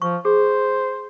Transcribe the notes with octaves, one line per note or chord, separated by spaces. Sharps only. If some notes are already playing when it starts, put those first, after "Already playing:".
F3 C#6
G#4 C5